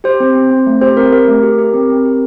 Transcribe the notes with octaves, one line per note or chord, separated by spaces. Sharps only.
G4 C5
C4
C4
C4
A3
G4 C5
C4 A#4
G4 A#4
A3
G4
G4
C4
C4
G4